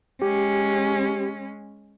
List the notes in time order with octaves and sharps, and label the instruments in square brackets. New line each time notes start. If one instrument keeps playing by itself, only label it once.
[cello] G#3 C#4 [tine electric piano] G4